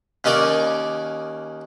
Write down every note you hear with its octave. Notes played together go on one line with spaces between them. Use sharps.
D#2 C#4 D#4 A#4 D5